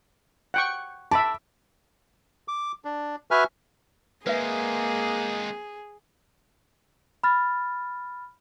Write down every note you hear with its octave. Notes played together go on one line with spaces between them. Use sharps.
F#5 G5 C#6
E5 A5 B5 D6
D6
D4
F#4 B4 E5 G#5 F6
G#3 A#3 C4 G#4 B4 E5
B5 F6 A6